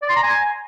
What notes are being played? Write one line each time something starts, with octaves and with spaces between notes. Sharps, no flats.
D5
C6
A#5
G#5